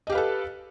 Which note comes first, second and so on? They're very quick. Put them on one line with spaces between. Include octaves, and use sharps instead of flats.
D#5 G4 F5 B4 A4